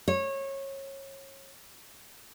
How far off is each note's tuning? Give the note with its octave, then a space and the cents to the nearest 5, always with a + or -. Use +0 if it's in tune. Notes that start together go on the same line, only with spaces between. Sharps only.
C#5 -25